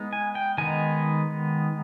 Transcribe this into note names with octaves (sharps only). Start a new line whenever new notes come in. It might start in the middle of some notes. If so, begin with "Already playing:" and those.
Already playing: G#3 B3 D#4
G#5
G5
D#3 G#3 B3 D#4 G#5